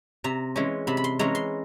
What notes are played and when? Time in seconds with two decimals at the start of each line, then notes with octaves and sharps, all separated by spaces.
0.24 C3 A#5
0.56 E3 G#3 C#4
0.87 C3 B5
0.97 B5
1.04 C6
1.19 E3 G#3 C#4 A#5
1.35 C6